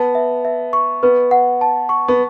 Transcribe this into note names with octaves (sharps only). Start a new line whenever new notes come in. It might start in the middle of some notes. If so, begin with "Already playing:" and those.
Already playing: B3 A5
E5
E5
C#6
B3 B4
F#5
A5
C#6
B3